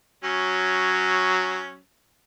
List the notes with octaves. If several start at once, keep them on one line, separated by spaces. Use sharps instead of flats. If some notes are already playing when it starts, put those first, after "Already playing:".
F#3 C#4